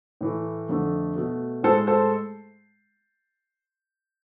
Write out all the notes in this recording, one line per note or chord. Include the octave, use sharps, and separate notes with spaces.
A2 E3 A3
F2 D3 A3
B2 A3
A2 G#3 A4 C5
A4 C5